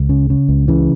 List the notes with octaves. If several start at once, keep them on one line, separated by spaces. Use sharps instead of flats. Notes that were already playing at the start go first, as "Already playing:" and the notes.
Already playing: C#2
C#3
C#3
C#2
C#3 E3